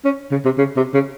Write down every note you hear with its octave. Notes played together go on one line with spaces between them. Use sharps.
C#4
C#3
C3
C#3
C3
C#3